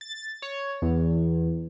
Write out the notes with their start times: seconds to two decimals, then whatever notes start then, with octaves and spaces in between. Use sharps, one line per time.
0.01 A6
0.42 C#5
0.82 E2